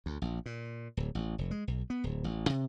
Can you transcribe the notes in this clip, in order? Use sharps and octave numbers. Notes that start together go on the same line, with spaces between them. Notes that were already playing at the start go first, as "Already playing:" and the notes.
D2
A#1
A#2
D1
A1
F1
G#3
B1
B3
D1
A1
C3